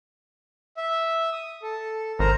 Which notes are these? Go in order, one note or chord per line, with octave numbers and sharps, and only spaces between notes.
E5
D#6
A4
G#1 A#4 C5 A#5